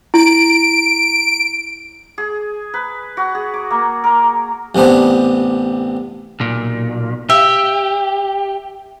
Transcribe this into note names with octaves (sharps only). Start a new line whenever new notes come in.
E4 A#5 D7
G#4
B4
F#4
G#4
D6
A#3
A#4
A1 C3 B3 D4 C5
B1 A#2
G4 E5